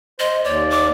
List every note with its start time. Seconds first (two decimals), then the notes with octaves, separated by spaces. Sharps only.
0.20 C5 D#5
0.45 D#2 C#5 D5
0.70 D6